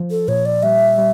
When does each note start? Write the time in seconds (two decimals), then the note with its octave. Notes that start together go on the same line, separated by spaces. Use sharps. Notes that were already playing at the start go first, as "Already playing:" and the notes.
Already playing: F3
0.11 A4
0.28 A#2 C#5
0.45 D5
0.62 G3 E5
0.97 G3